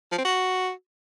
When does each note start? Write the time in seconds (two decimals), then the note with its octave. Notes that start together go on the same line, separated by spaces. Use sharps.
0.12 F3
0.18 C4
0.25 F#4